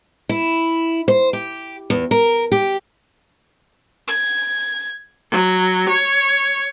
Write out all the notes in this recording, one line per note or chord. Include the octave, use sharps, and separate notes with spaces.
E4
C5
G4
E2
A#4
G4
G#6
F#3
C#5